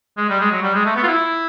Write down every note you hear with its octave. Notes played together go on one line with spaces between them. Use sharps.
G#3
G3
G#3
F#3
G3
G#3
A3
B3
F4
E4